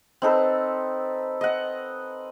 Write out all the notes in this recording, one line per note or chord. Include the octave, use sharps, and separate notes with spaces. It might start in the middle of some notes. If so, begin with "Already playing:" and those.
C4 D#4 A4 B4
D#5 F#5